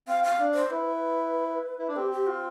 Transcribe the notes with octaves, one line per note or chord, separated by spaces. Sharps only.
C4 F5
F5
D4
C5
E4 B4
E4
D4
C4 G4
G4
F4